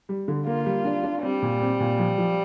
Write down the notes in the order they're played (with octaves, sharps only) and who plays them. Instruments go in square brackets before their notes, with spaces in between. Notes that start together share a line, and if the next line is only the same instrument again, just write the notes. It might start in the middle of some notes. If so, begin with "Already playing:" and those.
[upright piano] G3
D3
[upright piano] A#3 [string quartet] F4
[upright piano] G3
D4
D4
[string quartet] G3 [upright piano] C4
[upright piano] A#2
C4
A#2
F3
F3